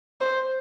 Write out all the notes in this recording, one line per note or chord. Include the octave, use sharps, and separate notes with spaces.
C5